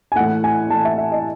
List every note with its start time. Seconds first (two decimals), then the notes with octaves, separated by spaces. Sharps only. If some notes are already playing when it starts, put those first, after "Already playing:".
0.12 G#5
0.16 A2 E3 A3 F#5
0.44 G#5
0.70 A2 E3 A3 A5
0.85 E5
0.98 E5
1.12 D#5